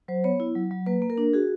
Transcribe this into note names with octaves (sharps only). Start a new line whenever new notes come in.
F#3 C5
B3 C#5
E4
F#3
F#3
A#3 B4
A#3
A#4
D4
F#4 G#4